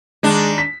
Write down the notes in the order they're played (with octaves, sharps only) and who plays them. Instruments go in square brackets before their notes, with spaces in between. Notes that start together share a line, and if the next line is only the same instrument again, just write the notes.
[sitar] D#3 D4 [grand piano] G#3
[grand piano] B6